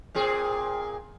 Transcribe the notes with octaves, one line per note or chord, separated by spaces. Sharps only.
A#2 C4 G#4